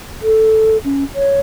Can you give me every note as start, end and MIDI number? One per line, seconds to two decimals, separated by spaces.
0.22 0.77 69
0.84 1.04 61
1.15 1.40 73